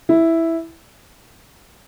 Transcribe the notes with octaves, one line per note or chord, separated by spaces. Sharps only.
E4